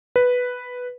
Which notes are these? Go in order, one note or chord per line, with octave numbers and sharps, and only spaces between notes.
B4